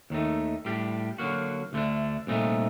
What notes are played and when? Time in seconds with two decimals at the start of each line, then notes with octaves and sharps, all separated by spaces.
0.10 D#2 D#3 A3 D#4
0.65 A2 G3 D4 G4
1.18 D3 F#3 A#3 F#4
1.73 D2 D3 A3 D4
2.27 C2 A#2 A3 D#4